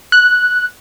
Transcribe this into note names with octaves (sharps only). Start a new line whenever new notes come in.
F#6